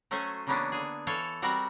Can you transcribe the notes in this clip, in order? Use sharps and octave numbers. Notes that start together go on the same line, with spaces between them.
F#3 A3 C#4 C5 G#5
C#3 E3 A#3 B3 C#4 D4
D3 G#4
E3 A4 C#5 F5 A5
G3 C4 F#4 A#4